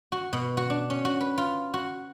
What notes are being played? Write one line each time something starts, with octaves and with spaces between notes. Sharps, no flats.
F#4
B2
F#4
D4
C#4
F#4
B4
F4
F#4